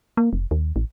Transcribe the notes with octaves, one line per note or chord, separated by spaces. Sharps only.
A#3
F1
D#2
A1